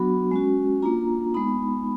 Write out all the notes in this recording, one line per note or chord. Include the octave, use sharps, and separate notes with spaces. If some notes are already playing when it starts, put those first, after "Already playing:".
Already playing: F#3 B3 D4 F#4 B5
G#3 C#4 F#4
A#3 D4 F4 A#5
G#3 B3 D#4 B5